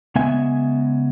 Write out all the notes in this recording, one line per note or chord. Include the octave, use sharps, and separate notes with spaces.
C#3 G#3 B3 E5 G#5